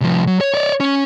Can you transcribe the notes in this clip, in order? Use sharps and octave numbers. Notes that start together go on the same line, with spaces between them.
C2 F3
F#3
C#5
C#5 D5
C#4